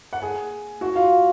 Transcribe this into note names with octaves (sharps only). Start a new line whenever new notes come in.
F#5
G#4 G#5
F#4 F#5
F4 F5